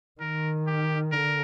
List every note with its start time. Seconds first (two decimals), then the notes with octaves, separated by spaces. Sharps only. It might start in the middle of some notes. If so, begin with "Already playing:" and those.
0.21 D#3 A#4
0.67 G4
1.12 D3 A#4